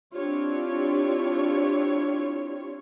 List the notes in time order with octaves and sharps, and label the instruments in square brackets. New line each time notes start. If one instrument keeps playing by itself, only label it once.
[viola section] C4 D4 E4 F4 G4 C#5